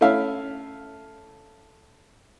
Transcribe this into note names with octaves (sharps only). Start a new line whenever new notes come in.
A3 C#4 E4 E5 F5